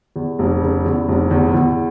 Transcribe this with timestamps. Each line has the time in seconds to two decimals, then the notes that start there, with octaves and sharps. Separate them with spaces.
0.16 E2
0.39 F1
0.62 C#3
0.85 E2
1.08 F1
1.31 E2
1.54 E2